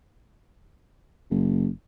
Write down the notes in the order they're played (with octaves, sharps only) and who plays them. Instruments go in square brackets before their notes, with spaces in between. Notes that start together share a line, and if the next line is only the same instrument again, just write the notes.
[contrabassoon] F#1